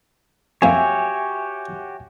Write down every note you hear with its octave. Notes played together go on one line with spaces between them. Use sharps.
F2 A#3 F#4 G4 C#5 E5 G#5